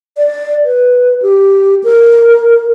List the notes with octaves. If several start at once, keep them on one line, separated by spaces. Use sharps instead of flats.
D5
B4
G4
A#4